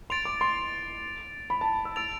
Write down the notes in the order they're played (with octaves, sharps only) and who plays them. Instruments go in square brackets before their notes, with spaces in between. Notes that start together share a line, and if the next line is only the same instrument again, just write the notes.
[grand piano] C6 [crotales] A6 D7 F7
[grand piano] D6
C6
B5
A5
E6
[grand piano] E6 [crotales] A6 D7 F7